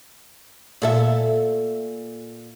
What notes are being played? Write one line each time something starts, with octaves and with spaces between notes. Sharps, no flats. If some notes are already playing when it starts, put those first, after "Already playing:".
A#2 A4 E5